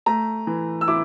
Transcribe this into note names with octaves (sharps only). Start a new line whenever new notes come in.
A3 A#5
E3
E6
E4 D6